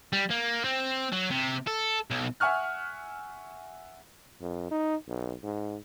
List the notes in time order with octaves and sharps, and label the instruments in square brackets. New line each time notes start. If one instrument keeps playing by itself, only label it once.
[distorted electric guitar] G3
A#3
C4
F#3
C3
A4
B1
[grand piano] E5 F#5 G#5 C#6 F6 F#6
[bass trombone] F2
D#4
B1
G#2